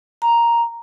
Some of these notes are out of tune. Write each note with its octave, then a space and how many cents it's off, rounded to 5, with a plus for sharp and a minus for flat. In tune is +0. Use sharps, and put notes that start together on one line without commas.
A#5 +5